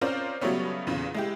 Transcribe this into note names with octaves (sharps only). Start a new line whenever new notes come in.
C4 C#4 F4 A#4 C5 D5
C#3 F#3 G3 A3 B3 C#4
E2 A#2 C#3
G#3 E4 G4